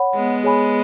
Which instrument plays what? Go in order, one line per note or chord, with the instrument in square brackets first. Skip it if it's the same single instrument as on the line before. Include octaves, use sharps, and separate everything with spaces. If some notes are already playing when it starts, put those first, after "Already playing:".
Already playing: [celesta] C#5 F#5 B5
[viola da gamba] G#3 B3
[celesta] G#4 C#5 G#5 B5